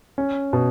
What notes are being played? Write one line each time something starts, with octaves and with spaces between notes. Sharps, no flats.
C#4
B2